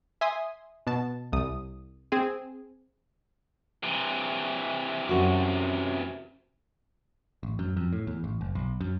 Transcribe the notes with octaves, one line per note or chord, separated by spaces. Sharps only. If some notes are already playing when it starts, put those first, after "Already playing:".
E5 G#5 C6 D#6
B2 A5
C2 D#6
C4 G#4 G#5
C3 E3
F#2 F#4
A1
F#2
F2
A2
E2
A1
F#1
B1
F#2